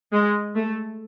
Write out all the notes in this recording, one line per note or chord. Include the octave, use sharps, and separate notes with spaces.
G#3
A3